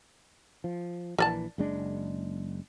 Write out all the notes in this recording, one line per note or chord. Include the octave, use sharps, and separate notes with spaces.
F3
A#1 E3 A#4 D5 A5
F#1 G#3 D4